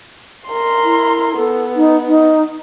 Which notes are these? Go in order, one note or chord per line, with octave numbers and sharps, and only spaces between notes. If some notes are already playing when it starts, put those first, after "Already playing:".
A#4 C6
E4
B3 A4
D#4
D#4